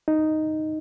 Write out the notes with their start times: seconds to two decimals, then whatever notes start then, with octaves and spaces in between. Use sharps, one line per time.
0.08 D#4